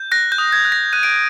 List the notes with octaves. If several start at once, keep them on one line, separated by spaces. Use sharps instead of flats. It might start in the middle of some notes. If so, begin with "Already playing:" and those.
Already playing: G6
F#6 A#6
G6
D#6
G#6
F#6
A#6
F#6 D#7
D7